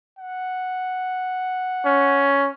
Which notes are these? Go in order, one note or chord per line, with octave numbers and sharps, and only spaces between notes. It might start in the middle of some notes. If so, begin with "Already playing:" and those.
F#5
C#4